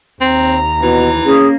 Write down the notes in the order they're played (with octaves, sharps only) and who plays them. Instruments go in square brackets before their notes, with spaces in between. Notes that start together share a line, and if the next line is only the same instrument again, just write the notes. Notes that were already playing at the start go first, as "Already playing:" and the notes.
[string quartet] D#2 A#5 [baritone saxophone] C4
[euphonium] B2 [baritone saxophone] E3
[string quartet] A#3 [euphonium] C#4 [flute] G#4